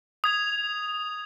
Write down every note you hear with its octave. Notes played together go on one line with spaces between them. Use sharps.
D#6 G#6 F7